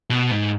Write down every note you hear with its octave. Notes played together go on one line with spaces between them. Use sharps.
B2
G#2